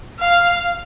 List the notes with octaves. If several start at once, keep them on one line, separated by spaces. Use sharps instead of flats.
F5